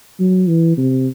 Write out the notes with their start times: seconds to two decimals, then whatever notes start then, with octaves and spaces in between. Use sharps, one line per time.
0.20 F#3
0.49 E3
0.77 C3